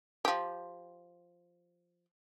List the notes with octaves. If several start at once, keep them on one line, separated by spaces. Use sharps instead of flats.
F3 G4